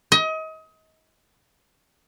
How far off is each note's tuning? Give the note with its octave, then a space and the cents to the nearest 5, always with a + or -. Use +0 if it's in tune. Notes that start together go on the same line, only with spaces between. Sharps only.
D#5 +30